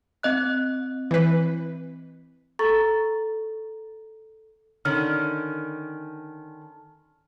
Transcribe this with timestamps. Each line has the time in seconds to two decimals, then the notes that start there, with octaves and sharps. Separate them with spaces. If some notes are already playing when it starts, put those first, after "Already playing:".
0.23 C4 D#5 F#6
1.11 E3 B4
2.59 A4 A#5 C#6 A6
4.85 D3 D#3 C#4 F6